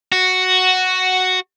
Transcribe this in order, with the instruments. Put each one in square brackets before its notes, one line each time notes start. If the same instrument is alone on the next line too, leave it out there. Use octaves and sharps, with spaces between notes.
[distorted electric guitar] F#4